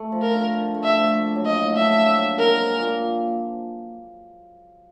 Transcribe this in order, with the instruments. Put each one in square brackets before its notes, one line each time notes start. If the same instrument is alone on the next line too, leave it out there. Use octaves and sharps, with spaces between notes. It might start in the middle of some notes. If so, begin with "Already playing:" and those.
Already playing: [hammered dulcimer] A3
F3
[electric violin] A#4
[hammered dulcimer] D3
D3
A3
[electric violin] E5
[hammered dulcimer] F3
A#3
F#3
[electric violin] D#5
[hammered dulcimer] A2
[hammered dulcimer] D4 [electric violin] E5
[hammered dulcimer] A#3
F#3
[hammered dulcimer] G#3 [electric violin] A#4
[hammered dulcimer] F3
A#2